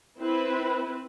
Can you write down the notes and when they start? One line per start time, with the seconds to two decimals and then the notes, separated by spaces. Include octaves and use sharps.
0.18 C4 E4 B4